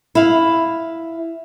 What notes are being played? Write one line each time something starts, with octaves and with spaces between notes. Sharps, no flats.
E4 F5